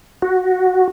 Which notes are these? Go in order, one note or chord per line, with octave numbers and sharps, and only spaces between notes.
F#4